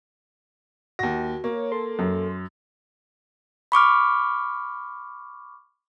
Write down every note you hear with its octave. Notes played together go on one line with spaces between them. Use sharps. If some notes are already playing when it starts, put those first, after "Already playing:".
D#2 F#4 A#6
A#3 C#5
A4 C6
F#2
B5 C#6 D6 F6